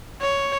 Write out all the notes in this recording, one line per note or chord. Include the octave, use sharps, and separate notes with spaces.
C#5